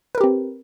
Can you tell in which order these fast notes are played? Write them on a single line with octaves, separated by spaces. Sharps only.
B4 A#4 G4 C4